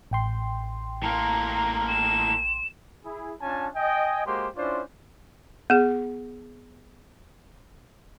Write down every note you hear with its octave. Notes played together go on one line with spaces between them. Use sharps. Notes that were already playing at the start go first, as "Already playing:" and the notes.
A1 G5 C6
A2 A#3 A#5
E7
E4 G#4
C#4 D4 F4 G#5 A5
D#5 G5 G#5
G#3 A#3 F#4 G4 C5 C6
C#4 D4 E4 F4 C5 D5
B3 G#4